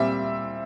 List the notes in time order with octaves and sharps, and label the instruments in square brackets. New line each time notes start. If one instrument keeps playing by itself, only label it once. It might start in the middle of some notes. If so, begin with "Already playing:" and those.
Already playing: [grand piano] A#2 G3 C4 E5